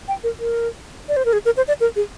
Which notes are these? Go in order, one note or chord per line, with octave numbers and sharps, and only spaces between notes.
G5
A#4
A#4
D5
C5
A#4
G#4
A#4
C5
D5
A#4
G#4